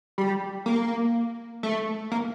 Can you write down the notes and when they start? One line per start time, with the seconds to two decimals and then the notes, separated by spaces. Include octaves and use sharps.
0.18 G3
0.66 A#3
1.63 A3
2.11 A#3